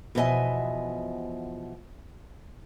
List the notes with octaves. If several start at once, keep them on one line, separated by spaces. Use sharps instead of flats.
E2 B2 F3 D#5 E5 G#5